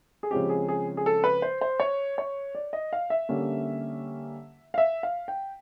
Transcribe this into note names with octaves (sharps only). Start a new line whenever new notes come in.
G#4
C#3 F3 G#3 C4 G4
G#4
G#4
G#4
A4
B4
C5
C5
C#5
C#5
D5
D#5
F5
E5
D3 G3 A#3 C#4
F5
E5
F5
G5